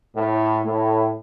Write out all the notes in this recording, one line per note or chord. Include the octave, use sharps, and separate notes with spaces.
A2
A2